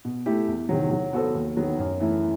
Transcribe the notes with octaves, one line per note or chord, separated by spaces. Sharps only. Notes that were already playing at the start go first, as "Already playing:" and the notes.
B2
A3 E4 G4
E2
C3 D#3 F#3
F#3
B3 F#4 A4 C5
D#2
D#3 F#3 B3
F#2
E3 A3 E4